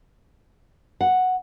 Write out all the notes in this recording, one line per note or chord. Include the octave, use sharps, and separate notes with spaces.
F#5